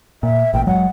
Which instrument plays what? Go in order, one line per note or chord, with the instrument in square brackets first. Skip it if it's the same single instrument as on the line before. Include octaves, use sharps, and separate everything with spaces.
[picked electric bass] A#2 [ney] E5
[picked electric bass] A1 A#2 [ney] G5
[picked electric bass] F#1 F#3 G#3 [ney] F#5